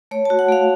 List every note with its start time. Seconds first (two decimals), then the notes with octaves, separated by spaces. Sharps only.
0.11 A3 C#5
0.25 F#4 A5
0.39 F#5
0.49 A3 F5